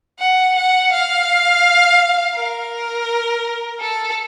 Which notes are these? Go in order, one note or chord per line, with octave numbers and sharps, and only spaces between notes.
F#5
F#5
F5
A#4
A4